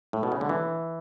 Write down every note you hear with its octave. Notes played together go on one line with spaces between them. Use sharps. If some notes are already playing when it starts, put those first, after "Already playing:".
A2
B2
C#3
D3
E3